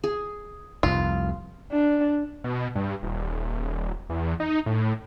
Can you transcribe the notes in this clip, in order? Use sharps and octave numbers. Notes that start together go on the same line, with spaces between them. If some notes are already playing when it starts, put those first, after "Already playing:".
G#4
F1 C2 F4
D4
B2
G2
D#1
E2
D#4
A2